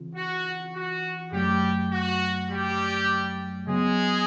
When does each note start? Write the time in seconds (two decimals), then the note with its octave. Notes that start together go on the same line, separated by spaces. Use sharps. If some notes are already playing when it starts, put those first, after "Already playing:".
Already playing: C#3 E3 C4 F4
0.14 F#4
0.73 F#4
1.32 F#2 C#3 F#3 G3 A3 G4
1.91 F#4
2.49 G3 G4
3.67 C#3 F#3 G#3 B3 G#4